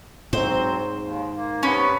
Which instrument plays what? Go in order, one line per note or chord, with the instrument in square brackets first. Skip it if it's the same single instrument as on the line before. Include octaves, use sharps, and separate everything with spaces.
[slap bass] G#2 [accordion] F#3 C4 [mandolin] C5
[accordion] D#2
A#3
[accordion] C3 B3 B4 [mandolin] C#4